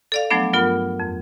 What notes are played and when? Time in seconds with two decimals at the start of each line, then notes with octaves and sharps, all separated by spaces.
0.12 A4 D5 F5
0.30 F3 F#3 A3 B3 D4
0.53 G2 F#3 B3 F4 A#4
1.00 F2